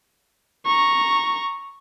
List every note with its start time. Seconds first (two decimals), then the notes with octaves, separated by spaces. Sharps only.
0.66 A#5 C#6